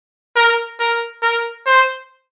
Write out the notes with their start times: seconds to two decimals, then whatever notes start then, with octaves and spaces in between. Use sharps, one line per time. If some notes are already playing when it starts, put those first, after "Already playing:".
0.36 A#4
0.80 A#4
1.23 A#4
1.66 C5